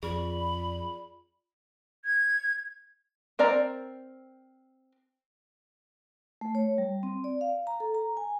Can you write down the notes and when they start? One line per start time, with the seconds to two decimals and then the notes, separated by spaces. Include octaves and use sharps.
0.03 F2 F4 G#4 D5 B5
2.04 G#6
3.39 C4 A#4 D5 A#5
6.41 A3
6.55 C#5
6.78 G3
7.03 C4
7.24 D5
7.41 F5
7.67 A#5
7.80 A4
7.94 A#5
8.17 G#5